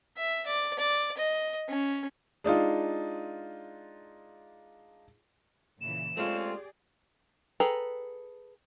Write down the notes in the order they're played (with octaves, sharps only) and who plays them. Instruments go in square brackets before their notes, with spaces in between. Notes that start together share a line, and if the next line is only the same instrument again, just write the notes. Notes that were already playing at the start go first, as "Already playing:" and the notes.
[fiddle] E5
D5
D5
D#5
C#4
[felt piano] G#3 D4 D#4 F4
[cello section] A#2 C#3 E3 [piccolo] E7
[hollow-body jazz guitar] G#3 A3 [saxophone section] C4 C#4 F4 [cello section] G4 G#4 D5
[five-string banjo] G#4 A4 B4 G5 A#5